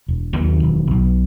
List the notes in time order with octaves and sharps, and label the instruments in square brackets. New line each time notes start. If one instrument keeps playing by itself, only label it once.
[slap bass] E1
D#2 D#3 F#3
E1
B1